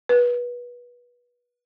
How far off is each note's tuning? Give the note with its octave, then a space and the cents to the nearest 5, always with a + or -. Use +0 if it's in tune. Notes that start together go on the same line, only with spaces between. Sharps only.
B4 -25